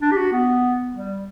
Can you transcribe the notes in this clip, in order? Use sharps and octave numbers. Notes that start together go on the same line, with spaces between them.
D4
G4
F#4
B3
G3